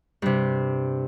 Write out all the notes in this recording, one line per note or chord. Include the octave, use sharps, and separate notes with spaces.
G2 C3